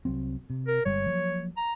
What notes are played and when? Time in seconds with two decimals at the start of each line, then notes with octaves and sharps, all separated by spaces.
0.05 C2 F#3 C4
0.50 C3
0.67 A#4
0.86 G1 G3 G#3 C#5
1.07 F3 F#3 A#3
1.57 A#5